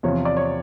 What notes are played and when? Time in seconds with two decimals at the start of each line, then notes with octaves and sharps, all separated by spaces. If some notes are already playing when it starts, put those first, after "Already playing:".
0.03 E2 C3 F3 C#5
0.25 D5
0.37 C#5